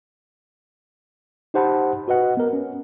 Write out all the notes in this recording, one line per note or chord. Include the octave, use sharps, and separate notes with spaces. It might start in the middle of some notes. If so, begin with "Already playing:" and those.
D#4 G4 C5 F#5 A5 B5
F#4 B4 D#5 F#5
B3 A#4
C#4